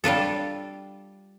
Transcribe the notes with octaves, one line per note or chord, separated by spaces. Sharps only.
G3 D4 F4 A4